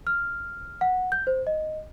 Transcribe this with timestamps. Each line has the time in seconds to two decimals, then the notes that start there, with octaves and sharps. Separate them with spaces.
0.07 F6
0.81 F#5
1.12 G6
1.27 C5
1.47 D#5